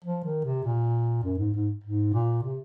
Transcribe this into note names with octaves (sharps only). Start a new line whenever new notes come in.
F3
D#3
C3
A#2
F#2
G#2
G#2
G#2
A#2
C3